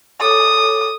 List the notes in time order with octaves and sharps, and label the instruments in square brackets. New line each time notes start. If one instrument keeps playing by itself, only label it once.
[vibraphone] A4 C#5 D6 [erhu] D#6